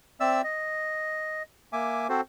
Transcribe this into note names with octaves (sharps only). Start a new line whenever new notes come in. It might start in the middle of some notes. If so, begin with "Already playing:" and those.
C4 D5 E5 E6
D#5
A#3 E5 G#5 D6
C4 F#4 A4 C5